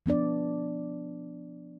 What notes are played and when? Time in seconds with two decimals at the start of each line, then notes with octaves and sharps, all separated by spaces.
0.06 F3 B3 D4 D5